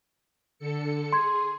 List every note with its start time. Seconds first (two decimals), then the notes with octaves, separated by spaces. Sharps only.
0.59 D3 A4 C#7
1.13 G#4 C6 G#6